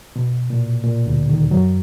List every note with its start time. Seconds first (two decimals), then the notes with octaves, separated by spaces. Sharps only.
0.16 B2
0.50 A#2
0.84 A#2
1.06 D2 D3
1.29 D#2 D#3
1.51 F#2 F#3